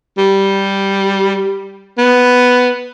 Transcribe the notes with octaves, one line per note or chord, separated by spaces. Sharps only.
G3
B3